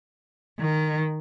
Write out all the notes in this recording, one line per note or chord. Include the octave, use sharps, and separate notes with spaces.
D#3